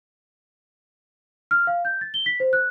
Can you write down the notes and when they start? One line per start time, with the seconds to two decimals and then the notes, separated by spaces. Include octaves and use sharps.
1.51 F6
1.67 F5
1.85 G6
2.01 A6
2.14 G7
2.26 B6
2.40 C5
2.53 F#6